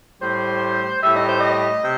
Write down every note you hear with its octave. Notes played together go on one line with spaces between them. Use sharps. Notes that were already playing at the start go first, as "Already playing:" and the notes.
A2 G3 C5
A2 G3 E5
D#5
C5
D#5
C3